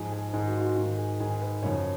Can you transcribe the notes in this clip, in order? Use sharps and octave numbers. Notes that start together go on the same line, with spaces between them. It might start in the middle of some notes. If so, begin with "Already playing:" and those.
Already playing: G#2 F3 G#4
G#4
G#2 D#3 G#4
F#4
F4
F#4
G#2 D#3
G#4
G#2 D#3 G#4
B4
F#2 C#3 F3 C#5